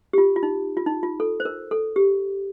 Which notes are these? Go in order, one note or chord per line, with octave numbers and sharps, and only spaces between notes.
G4
F4
F4
D#4
F4
D#4
F4
A4
C5
A#4
A4
G4